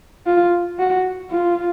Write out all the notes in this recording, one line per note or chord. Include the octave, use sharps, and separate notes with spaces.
F4
F#4
F4